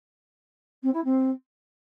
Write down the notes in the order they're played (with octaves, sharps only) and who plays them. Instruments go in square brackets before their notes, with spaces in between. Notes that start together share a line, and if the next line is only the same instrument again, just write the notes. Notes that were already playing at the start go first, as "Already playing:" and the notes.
[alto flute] C4
E4
C4